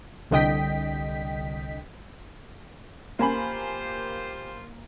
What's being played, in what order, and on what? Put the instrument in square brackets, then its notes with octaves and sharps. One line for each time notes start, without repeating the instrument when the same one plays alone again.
[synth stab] C2 D3 D#5 G5 B6
[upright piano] A#3 G#5 B5 [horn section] F4 G4 C5